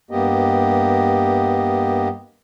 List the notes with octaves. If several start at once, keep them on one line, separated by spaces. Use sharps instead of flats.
G2 A#3 B3 G4 D#5